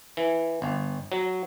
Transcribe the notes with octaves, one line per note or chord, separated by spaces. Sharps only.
E3
G1
F#3